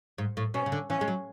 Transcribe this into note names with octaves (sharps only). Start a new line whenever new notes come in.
G#2
A2
B2 C#4
C#3
D3
E3 C#4
G#3
F#3